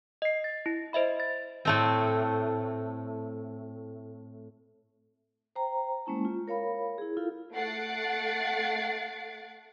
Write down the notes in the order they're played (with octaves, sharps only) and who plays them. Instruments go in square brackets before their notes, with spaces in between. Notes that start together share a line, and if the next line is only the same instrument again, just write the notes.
[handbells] D#5 C7
A6
E4
C5 D#5 E5 B5
A6
[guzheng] A2 A3 C4
[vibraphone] C5 G5 A#5
G#3 A#3 C#4 E4 A5
F4
A#4 C#5 F5 B5
E4 G#4
E4 F4 A4 F5
[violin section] A3 F#5 A6 C7 D7